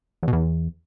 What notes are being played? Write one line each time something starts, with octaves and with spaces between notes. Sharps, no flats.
E2
B2
E2